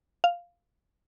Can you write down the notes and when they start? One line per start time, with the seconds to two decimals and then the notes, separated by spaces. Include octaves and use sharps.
0.24 F5